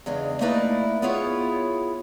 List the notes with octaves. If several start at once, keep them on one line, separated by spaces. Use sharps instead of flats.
E2 C#3 G#3 D4 D#4
A3 A#3 D#4 E4 B4 D5
B3 E4 F4 G#4 C#5